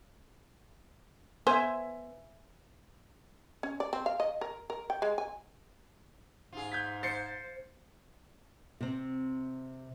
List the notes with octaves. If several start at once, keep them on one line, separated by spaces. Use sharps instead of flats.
B3 C5 E5 G#5
C#4
D5
C4
F5
D#5
A#4
A#4
G5
G#3
G#5
G#2 F4 G#4
G6 G#6 B6
C5 A6 C7 C#7
C3 C4